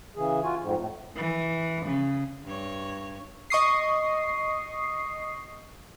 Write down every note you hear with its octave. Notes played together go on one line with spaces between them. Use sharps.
C#3 E3 G#4
F4 F#4 G#5
F2 G#2
A2
E3
C#3
G2 C#5
D#5 C#6 D#6 C7